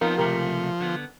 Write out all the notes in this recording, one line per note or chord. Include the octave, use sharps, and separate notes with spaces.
F3 B3 C4 D#4 A#4 F5
C#2 C3 A3 G4 A#4
D3 B3